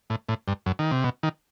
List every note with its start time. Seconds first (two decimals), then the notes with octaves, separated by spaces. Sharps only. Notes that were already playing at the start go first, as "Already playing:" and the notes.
0.10 A2
0.29 A2
0.48 G2
0.66 F#2
0.79 D#3
0.91 C3
1.04 B2
1.23 D#3